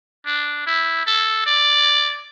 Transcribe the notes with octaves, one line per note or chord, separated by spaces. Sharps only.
D4
E4
A4
D5